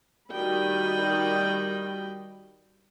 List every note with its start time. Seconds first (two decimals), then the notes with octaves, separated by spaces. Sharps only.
0.31 D#3 G3 F#4 D#5 G5 B5